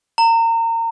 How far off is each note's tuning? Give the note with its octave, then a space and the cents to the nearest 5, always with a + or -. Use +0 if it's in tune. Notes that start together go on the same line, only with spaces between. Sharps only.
A#5 -30